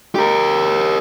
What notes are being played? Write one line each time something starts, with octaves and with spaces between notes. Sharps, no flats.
G4 A#4